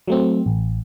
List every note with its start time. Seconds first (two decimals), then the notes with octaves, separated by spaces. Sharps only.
0.08 F#3 A3 C4
0.46 A1